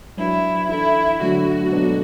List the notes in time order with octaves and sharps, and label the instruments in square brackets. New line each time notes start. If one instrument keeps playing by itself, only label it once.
[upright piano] F#3 D4 B4 [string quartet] E4
[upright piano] E3 D4 A4 [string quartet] E4
[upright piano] D3 F#3 A3 D4 [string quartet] F#4
[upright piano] B2 F#3 B3 D4 A4